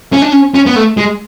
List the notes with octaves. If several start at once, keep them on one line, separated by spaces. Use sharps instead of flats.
C#4
D4
C#4
C#4
B3
A3
G#3